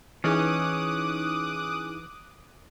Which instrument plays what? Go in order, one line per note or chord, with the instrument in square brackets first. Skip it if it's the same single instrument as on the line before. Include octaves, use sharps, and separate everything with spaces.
[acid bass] E3 [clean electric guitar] C#4 [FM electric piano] D#4 E4 G#4 [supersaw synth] D6 D#6 F#6